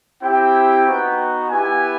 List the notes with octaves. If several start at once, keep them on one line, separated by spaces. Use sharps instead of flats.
C4 E4 G4 G5
B3 D#4 F#4
B3 E4 G4 G#5